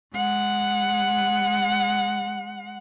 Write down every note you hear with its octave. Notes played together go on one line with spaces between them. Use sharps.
G#3 F#5